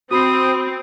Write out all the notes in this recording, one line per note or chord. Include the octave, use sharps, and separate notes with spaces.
C4 F#4 B5 D#6 C7